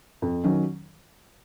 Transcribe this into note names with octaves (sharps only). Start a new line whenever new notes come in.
F2
D#3 F#3 C#4